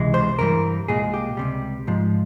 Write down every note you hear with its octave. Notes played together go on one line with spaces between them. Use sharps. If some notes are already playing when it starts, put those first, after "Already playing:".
Already playing: C#2 C3 E3 G#3
C5
G2 E3 G3 A#4
C2 A#2 G#3 G#4
G4
C#2 C3 G3
G#2 F3 G#3